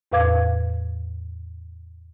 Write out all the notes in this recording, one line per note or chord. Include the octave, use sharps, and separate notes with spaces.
E2 A2 B4 F5 D6 G#6